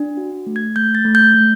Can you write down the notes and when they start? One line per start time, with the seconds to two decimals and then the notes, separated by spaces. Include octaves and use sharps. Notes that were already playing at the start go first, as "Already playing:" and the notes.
Already playing: D4
0.17 F#4
0.47 A3
0.56 G#6
0.76 A3 G6
0.95 A6
1.05 A3
1.15 G6
1.34 A3